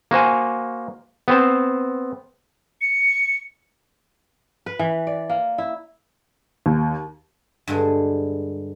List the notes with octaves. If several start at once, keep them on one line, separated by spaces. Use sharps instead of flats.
A#3 F#4 C5 G#5
B3 C4 C5
C#7
B4
E3
D5
A#3
E4
D#2
G2 D3 G#3